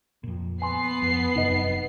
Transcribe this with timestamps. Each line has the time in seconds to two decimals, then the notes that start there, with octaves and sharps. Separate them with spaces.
0.24 F2 A#2
0.62 B3 G#5 C6 C7
1.02 F2
1.36 F#1 F#2 C3 D#4 D#5